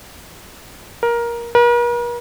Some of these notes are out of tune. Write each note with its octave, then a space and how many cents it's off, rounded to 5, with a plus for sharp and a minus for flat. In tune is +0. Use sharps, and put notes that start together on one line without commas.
A#4 +15
A#4 +45